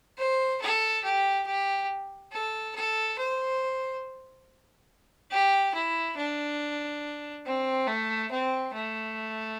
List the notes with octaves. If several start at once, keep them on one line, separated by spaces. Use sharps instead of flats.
C5
A4
G4
G4
A4
A4
C5
G4
E4
D4
C4
A3
C4
A3